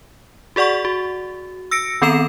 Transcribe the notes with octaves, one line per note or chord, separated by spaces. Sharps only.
F#4 G#4 D5 F#5 C#6
F#4
E6 A#6 C#7 D7
D#3 B3 C4 A4 A#5 E7